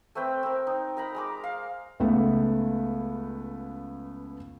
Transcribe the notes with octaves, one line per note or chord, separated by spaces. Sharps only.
A3 C4 B4 G5
C4 A#4
D#4
A#4 A#5 B5
G#3 A#4 D6
F5
C#2 A3 B3